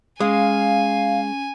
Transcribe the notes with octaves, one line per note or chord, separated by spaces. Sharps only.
G#3 C#4 F5 G#5